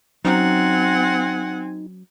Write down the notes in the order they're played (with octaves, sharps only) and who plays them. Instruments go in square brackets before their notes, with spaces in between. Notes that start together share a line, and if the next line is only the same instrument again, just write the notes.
[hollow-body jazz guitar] F#3 C#4 C5 [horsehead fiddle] C4 G#5 [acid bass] D#4 [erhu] F#5